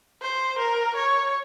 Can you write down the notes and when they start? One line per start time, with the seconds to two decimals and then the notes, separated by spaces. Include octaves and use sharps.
0.22 C5
0.58 A#4
0.96 C#5